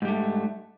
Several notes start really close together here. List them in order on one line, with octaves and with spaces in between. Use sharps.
G#2 G3 A3